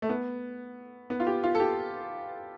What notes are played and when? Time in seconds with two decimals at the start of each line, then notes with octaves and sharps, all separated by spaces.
0.02 A3
0.09 B3
1.10 B3
1.20 F4
1.27 G4
1.44 F4
1.55 A4
1.60 G4